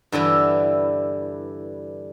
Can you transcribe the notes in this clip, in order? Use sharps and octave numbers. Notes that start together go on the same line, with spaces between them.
G2 D3 E3 E4